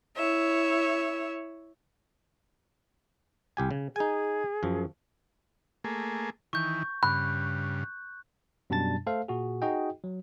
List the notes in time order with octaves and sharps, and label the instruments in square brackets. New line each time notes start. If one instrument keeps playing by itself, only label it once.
[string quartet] E4 C#5 E5
[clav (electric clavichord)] C2 G4 G#5
C#3
[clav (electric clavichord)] D#4 G#5 [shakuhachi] G#4
[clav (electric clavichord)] F#2 F3
[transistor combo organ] A3 A#3 G#4
[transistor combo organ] D#3 E3 [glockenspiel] C#6 G6
[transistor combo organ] G2 C#3 [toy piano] B5 [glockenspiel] F#6
[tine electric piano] F#2 B2 G3 D4 A5 A6
A3 A4 C5 F5
A#2 F#4 G#4
D#4 F#4 G#4 D#5 G5
F#3